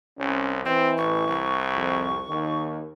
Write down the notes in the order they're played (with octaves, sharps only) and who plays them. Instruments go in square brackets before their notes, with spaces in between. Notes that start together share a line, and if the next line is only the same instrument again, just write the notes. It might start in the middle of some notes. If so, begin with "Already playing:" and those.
[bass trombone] C2 [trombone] C#4
[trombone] E3 [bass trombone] C4 [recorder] D#5
[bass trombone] A1 [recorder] C#6
[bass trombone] C2
[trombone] F2
[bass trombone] D#2 [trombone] D#3